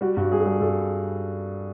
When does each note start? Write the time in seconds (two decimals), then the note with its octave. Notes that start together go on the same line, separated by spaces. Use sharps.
0.01 G3 F#4
0.17 G2 F#4
0.31 G3 G#4
0.39 A4
0.46 G3 G#4
0.61 G2 A4